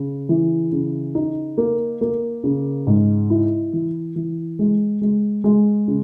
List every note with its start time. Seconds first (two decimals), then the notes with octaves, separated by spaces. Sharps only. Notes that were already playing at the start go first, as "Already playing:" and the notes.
Already playing: C#3
0.29 E3
0.72 C#3
1.15 D#4
1.58 A#3
2.01 A#3
2.44 C#3
2.87 G#2
3.30 E4
3.73 E3
4.16 E3
4.59 G#3
5.01 G#3
5.44 G#3
5.88 C#3